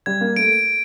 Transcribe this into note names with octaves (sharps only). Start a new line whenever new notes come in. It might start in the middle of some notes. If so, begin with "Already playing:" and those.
G3 G#6
A#3
A3 D7